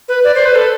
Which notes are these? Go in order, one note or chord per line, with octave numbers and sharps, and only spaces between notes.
B4
D5
C5
B4
A4